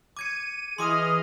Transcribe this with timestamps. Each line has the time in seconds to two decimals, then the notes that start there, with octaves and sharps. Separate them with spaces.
0.17 D6 G#6 C#7 D#7
0.78 E3 G#4 D#5 C6 D6 F6 D#7